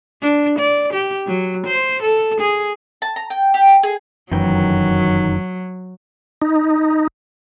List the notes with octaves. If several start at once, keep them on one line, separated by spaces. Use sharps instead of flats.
D4
D5
G4
F#3
C5
A4
G#4
A5
A#5
G5
G4
G#4
F1 F#2 D#3 E3 F#3 G5
D#4